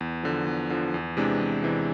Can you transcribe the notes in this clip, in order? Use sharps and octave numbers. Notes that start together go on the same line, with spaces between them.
E2
D3 F3
E2
D3 F3
E2
C3 E3 G#3 D4
E2
C3 E3 G#3 D4